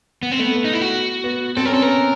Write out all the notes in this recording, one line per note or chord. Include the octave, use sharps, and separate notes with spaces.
B3
C4
A3 B3
B3
D#4
E4
F#4
B3
C4 A4
C#4 A#4
C4 A4
B3 A#4